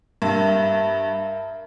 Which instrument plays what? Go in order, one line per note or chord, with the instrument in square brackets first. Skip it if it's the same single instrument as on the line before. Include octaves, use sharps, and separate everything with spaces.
[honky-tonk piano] G2 [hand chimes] A#4 E5